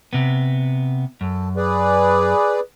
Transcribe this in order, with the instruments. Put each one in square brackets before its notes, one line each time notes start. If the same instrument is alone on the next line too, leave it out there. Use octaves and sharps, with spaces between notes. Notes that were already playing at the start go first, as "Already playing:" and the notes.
[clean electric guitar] C3 B3
[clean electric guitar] F#2 [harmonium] A4
[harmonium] G#4 B4 D5